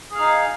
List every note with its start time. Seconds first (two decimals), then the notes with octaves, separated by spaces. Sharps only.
0.11 G#4
0.15 F5
0.19 D#4